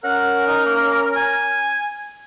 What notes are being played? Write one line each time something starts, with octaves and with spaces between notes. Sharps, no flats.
C#4 A#4 F#5
D#4
A#3
G#5